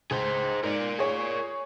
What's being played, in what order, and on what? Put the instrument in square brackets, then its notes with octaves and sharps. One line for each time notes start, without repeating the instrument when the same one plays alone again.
[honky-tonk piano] C#2 [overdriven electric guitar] G#4 C5
[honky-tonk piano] G#2 [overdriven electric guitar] A#4 D5
[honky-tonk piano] G#4 C#5